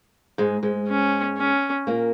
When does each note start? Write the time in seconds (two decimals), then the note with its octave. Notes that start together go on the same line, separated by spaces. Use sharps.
0.38 G#2 G#3
0.63 G#2 G#3
0.88 C#4
1.37 C#4
1.87 A#2 A#3